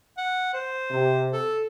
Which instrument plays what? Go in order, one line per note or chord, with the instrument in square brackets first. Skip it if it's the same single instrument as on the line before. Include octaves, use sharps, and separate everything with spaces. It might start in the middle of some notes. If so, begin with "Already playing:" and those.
[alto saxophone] F#5
C5
[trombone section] C3
[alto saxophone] A4